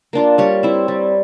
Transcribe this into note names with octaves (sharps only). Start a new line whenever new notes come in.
A#3 D4 F4
G3 C#5
C4 E4
G3